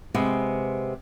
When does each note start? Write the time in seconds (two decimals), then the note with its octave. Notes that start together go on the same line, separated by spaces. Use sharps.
0.14 C3 G#3 B3